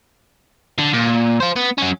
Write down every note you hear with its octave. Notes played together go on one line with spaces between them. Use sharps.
D3
A#2
F4 C5
B3
F#3 C#4